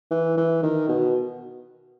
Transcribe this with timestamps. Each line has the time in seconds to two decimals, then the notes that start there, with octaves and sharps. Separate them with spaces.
0.11 E3
0.37 E3
0.63 D#3
0.88 B2